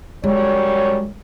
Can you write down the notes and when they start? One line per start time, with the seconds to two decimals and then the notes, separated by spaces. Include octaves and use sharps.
0.24 F#2 G3 G#3 C#5